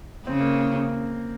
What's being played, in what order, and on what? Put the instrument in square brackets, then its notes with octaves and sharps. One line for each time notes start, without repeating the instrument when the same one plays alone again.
[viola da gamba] C#3 [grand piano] C4
[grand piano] A#3